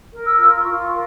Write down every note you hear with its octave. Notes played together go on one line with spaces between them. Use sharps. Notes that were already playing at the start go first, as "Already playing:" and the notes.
A#4
E6
F4 E6
C6
F4 C#6
C#6
A#4